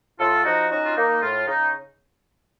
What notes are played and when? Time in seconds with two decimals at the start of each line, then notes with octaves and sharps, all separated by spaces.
0.19 A2 F4 A4
0.44 F3 D#4 F#4
0.70 C#4 D#4 F#4
0.85 F4
0.96 A#3 D#4
1.22 A2 F4
1.47 C#3 D#4